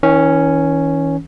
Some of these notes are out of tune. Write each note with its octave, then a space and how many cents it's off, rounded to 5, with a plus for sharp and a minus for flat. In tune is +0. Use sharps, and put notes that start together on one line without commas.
E3 -45 C#4 +0